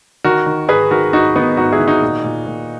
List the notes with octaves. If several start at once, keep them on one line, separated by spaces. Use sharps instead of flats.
D#3 F#4 A#4
D#3
G#2 G#4 B4
D#3 F#4 A#4
G#2 D#4 F#4
D#3 B3 D#4
G#2 D#4 F#4
E4 G#4
D#3
D#4 F#4
A#2
A#2
A#2